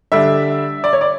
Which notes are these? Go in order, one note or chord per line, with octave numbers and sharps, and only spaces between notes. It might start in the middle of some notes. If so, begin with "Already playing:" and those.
D3 G3 D4 E5
D5
C#5
D5